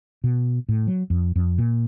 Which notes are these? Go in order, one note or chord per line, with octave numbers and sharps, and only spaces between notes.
B2
A2
F#3
F2
F2
A#2